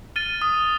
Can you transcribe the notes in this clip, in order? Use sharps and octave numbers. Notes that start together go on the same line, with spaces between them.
F6 A6 D#7 G7
D#6